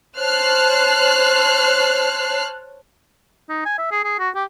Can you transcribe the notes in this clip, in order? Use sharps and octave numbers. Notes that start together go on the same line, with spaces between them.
C5 C#5 A5 F6 F#6 C7
D#4
G#5
E5
G#4
G#4
F#4
G4